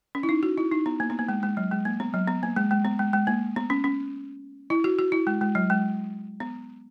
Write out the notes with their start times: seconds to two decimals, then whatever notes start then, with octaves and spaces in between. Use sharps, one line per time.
0.15 C#4
0.23 E4
0.29 D#4
0.43 F#4
0.58 E4
0.72 D#4
0.86 B3
1.00 A#3
1.10 B3
1.19 A#3
1.28 G#3
1.43 G#3
1.57 F#3
1.71 G#3
1.85 A#3
2.00 B3
2.14 F#3
2.28 B3
2.43 A#3
2.56 G#3
2.71 G#3
2.85 B3
2.99 G#3
3.13 G#3
3.27 A#3
3.56 B3
3.70 C#4
3.84 C#4
4.70 E4
4.84 F#4
4.99 F#4
5.12 E4
5.27 G#3
5.41 G#3
5.55 F#3
5.70 G#3
6.40 B3